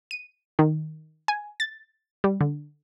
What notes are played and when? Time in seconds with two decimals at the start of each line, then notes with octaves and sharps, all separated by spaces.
0.11 D#7
0.59 D#3
1.28 G#5
1.60 A6
2.24 G3
2.41 D3